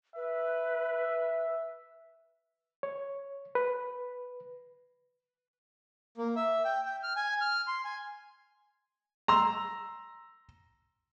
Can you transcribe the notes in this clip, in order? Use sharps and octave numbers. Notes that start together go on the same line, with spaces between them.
B4 E5
C#5
B4
A#3
E5
G5
G5
F6
G#5
F6
C6
G#5
A#5 C6 E6